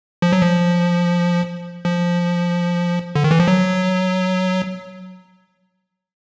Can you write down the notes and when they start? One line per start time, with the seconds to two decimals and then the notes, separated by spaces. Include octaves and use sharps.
0.22 F3
0.32 F#3
0.43 F3
1.85 F3
3.15 D3
3.24 D#3
3.31 E3
3.40 F3
3.48 F#3